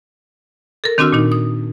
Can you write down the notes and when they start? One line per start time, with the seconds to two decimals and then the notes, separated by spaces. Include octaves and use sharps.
0.84 A4 A#4
0.98 D#3 C4 D4 F#4 E6 F6
1.13 A#2 D#3 D#4
1.32 D#6